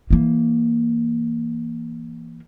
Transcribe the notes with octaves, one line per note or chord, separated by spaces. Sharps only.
E3 A#3